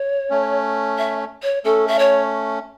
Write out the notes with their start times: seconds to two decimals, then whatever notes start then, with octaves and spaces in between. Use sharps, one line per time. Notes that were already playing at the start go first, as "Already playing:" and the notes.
Already playing: C#5
0.30 A3 C#4
0.98 E5
1.43 C#5
1.64 A3 C#4 A4
1.88 E5
1.99 C#5